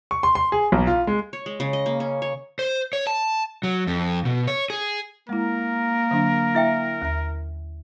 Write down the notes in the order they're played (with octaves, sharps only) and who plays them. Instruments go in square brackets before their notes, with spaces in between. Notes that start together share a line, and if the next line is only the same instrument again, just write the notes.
[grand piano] C#6
C6
C6
G#4
B1
F4
G#3
[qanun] C#5
G#3
C#3
D#5
A#3
C#4
C#5
[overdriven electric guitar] C5
C#5
A5
F#3
F2
B2
C#5
G#4
[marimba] G#3 E4 [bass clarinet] A#3 [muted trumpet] A#4
[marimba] D3 F#3 D4
[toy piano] E4 E5 G5
[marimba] D#2 A#5